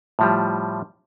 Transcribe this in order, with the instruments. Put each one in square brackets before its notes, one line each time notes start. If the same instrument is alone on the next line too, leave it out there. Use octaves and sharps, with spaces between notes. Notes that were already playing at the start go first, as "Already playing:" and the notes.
[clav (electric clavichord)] A2 F3 G3